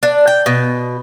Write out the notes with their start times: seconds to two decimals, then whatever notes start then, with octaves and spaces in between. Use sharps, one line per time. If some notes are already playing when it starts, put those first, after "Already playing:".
0.03 D4
0.27 G5
0.46 B2